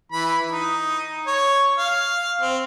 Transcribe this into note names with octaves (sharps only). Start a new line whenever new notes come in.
E3 B5
D#4
C#5
F5
C4